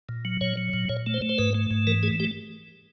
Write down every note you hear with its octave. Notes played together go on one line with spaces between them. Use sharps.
A#2
F#3
A#2 C#5
F#3
A#2
A#2 C#5
A3
C5
A3
C5
G#2 B4
A3
G#2
E3 A#4
A3 G#4
A3 G4